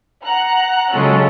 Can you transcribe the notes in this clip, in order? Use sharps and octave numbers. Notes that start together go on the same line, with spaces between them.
F#5 A#5 F#6
C#3 F#3 G#3 C#4 F4 A4